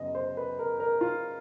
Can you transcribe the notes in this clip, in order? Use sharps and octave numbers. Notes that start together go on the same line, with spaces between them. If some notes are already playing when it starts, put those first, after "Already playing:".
Already playing: F#2 C#3 F#3 B3 D#5
C5
B4
A#4
A#4
F4